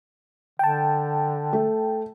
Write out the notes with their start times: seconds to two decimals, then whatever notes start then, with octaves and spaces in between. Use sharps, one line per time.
0.59 D3 G5 A5
1.53 A3